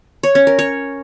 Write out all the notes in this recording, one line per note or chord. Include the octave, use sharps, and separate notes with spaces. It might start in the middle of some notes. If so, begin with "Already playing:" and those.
C#5
C#4
A#4
C#5